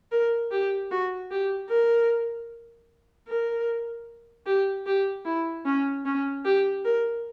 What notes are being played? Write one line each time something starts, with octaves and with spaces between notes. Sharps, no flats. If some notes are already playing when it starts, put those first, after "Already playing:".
A#4
G4
F#4
G4
A#4
A#4
G4
G4
E4
C#4
C#4
G4
A#4